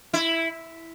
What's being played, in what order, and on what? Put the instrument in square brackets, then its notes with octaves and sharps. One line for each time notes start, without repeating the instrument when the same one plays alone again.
[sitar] E4